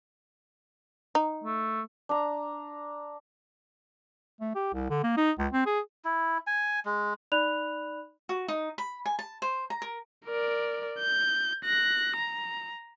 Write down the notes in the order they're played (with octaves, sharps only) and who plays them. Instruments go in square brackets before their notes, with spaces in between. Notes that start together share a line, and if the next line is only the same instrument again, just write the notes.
[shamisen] D#4
[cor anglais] A3
[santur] D4 A#5
[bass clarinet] A3
G4
C2
D3
A#3
D#4
C#2
C4
G#4
[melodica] E4
G#5
G#3
[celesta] D#4 D5 B5 F#6 F7
[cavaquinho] F#4
D#4
B5
G#5
A5
C5
A#5
A#4
[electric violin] A#4 D5
G6
F#6 A#6
A#5